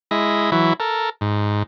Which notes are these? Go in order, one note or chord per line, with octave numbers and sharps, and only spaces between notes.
G#3 E4 D#5
E3 F#3 E4
A4 A#4
G#2